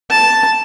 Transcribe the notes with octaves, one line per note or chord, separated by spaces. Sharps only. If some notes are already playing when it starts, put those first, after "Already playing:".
A5